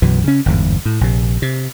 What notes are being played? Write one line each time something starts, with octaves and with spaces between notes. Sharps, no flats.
B1 F#2 B2 E3
C#3 C#4
G1 E2 G#2
A2
A#1 C3
C3